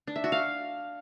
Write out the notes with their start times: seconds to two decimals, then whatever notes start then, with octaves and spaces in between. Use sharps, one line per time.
0.07 D4
0.16 E5
0.24 F#4
0.32 F5